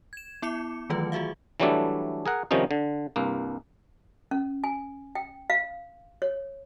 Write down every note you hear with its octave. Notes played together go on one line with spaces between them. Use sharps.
G#6 E7
B3 E4 D6 C#7
D#3 E3 F#3 A3 F4 B4
F4 F#4 G#4 E5 F5
E3 F#3 G3 A3 D4 A4
G#4 A#4 F#5
C3 D#3 F3 G3 C#4 D#4
D3
C2 G2 A#3
C#4
G#5
G5
F5
C#5